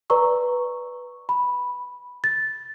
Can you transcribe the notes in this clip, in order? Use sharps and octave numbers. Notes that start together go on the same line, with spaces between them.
B4 D5 A#5 C#6 E6
B5
A6